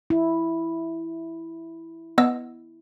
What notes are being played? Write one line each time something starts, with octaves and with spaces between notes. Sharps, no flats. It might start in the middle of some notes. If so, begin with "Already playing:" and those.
E4
B3 D#5 E6